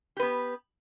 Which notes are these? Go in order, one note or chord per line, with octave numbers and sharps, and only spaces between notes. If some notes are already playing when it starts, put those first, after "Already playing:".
B3 G4 B4